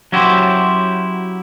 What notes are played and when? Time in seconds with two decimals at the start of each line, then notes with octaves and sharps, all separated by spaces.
0.12 F#3 C#4 E4 F#4 G4 C5